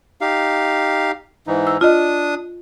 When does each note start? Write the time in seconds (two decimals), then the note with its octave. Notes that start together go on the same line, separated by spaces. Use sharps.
0.21 D#4 G4 F5
1.47 G#2 E3 D#4
1.67 E6
1.81 D4 F4 D#5 D#6